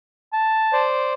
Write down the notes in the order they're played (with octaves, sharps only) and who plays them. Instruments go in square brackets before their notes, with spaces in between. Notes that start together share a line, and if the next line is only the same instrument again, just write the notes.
[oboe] A5
[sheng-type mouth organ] C5 D5